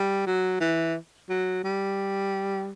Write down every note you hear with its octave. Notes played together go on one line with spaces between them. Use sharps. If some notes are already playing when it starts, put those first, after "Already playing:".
Already playing: G3
F#3
E3
F#3
G3